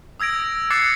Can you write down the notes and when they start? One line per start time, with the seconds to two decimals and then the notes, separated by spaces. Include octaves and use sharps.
0.20 D#6 E6 G#6 A#6 D7
0.71 D6 F#6 G#6 A6 C7 C#7